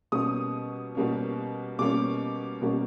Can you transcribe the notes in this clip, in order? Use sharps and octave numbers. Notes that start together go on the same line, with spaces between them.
B2 G3 A#3 C#4 D#6
B2 G3 A#3 C#4
B2 G3 A#3 C#4 D6
B2 G3 A#3 C#4